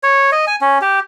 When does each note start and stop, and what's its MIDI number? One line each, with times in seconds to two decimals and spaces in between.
0.03 0.30 73
0.32 0.45 75
0.47 0.56 80
0.61 0.78 61
0.81 0.99 67